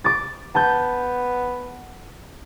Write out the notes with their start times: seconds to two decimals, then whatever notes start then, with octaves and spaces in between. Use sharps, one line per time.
0.04 D6 A6
0.55 B3 A5 G6